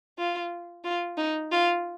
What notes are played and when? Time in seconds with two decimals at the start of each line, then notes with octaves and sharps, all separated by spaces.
0.18 F4
0.84 F4
1.17 D#4
1.51 F4